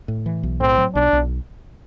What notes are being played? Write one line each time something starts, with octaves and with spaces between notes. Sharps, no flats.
A2
E3
B1
A2 C4
F#3
B1 D4
B1